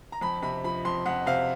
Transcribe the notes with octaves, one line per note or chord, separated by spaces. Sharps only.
A#5
F2 B5
C3 B5
F3 B5
F2 C6
F2 F#5
C3 F5